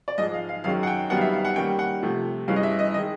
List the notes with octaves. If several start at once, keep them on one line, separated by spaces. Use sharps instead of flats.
D5
G#2 F3 G#3 D#5
F5
F5
F#2 D#3 G#3 C#4 F5
F#5
G5
F#2 D#3 G3 B3 F#5
F5
E5
F5
F#5
D#3 G3 A#3 C#4 G5
F#5
C3 F3 A3
G2 E3 G#3 C#4 F5
D#5
E5
D#5
D#3 G#3 D#5